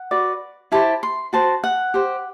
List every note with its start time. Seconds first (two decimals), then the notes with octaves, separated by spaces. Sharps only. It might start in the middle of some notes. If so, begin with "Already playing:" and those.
Already playing: F#5
0.11 F#4 B4 D5
0.72 E4 G4 C5 A5
1.03 C6
1.33 F#4 C5 A5
1.64 F#5
1.94 G4 C5